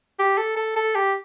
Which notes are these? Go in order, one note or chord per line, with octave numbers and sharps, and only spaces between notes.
G4
A4
A4
A4
G4